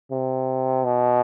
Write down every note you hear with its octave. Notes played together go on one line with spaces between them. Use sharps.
C3
B2